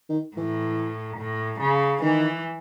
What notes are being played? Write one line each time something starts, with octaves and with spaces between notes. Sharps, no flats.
D#3
A2 E3
A2
C#3
D#3 E3